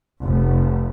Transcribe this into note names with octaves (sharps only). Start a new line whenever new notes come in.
F1